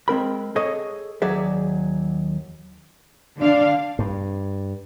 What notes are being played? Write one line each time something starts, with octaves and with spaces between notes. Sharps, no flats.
G#3 C4 A#4 B5
G#4 A4 C#5 D#5
D#2 F#3 G#4 D5 E5
D3 D4 F5
G2